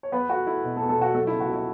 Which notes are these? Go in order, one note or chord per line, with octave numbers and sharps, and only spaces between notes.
C#5
E2 B3 B4
A3 F#4
A3 E4
B2
A3 A4
E2
A3 A4
B2 F#4
F#3 A3 A4
C#3 E4
F#4
C#2 E4